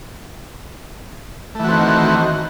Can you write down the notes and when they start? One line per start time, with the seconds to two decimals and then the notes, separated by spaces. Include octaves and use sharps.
1.55 A3
1.60 E3
1.64 F#4
1.68 C4
1.73 D#3